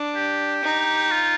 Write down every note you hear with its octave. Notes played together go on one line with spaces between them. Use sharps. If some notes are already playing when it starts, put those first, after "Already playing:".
Already playing: D4
G4
D#4
F4